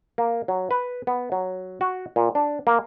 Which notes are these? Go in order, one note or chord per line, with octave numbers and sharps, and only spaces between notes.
A#3
F#3
B4
B3
F#3
F#4
A#2
D4
A#3